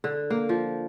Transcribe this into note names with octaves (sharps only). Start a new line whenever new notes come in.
D3
A#3
F3